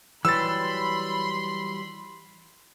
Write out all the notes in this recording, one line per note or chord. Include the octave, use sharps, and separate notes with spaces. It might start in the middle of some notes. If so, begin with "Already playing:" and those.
E3 F#3 G3 B5 C6 E6 A6